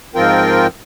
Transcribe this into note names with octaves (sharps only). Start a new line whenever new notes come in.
G#2 F3 C4 F4 A#4 G5